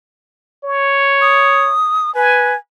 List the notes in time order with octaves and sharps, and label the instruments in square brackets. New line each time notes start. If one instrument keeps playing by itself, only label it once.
[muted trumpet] C#5
[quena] D#6
[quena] B4 [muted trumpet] G#5